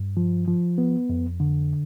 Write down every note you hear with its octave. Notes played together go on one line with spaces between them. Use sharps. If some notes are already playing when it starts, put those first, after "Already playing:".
Already playing: G2
F3
F3
B3
F2
D3